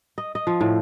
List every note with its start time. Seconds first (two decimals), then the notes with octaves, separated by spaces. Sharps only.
0.18 D#5
0.35 D#5
0.47 F3
0.61 A2